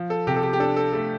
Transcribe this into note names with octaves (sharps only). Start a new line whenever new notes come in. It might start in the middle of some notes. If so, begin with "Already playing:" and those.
Already playing: F3
A4
C3 G4
A4
G4
G4
D4 A4
A4
A3 A4